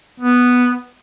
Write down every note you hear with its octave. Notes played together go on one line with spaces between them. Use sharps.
B3